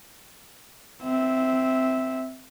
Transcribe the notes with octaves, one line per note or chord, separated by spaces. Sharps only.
C4 E5